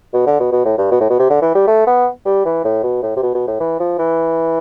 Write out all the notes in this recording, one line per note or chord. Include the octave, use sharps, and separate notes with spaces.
B2
D3
B2
B2
A2
G2
B2
A2
B2
C3
D3
E3
G3
A3
B3
G3
E3
A2
B2
A2
C3
B2
B2
A2
E3
F3
E3